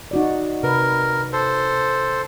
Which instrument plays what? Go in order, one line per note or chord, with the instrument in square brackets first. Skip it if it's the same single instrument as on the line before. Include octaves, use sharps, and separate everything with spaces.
[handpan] D#4 F#4 D5
[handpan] C3 B4 [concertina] A#4
[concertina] A4 C5